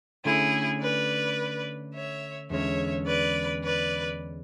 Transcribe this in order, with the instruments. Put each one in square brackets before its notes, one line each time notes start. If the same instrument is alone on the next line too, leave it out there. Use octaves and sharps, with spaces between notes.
[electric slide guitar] D3 A3 C#4 [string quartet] E4 G#4
[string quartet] B4 D5
C#5 E5
[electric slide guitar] E2 D3 G#3 C#4 [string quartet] C#5 E5
[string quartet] B4 D5
B4 D5